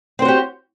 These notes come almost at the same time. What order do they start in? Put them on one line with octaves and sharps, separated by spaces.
C4 C5 F#4 G4